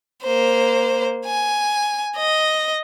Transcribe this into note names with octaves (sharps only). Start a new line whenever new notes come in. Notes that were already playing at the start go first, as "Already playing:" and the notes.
A#3 C5
G#5
D#5